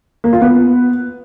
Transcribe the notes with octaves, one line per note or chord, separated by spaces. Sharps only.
A#3
F4
B3